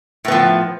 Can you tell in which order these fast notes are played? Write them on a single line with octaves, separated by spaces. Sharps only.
A2 B3 F3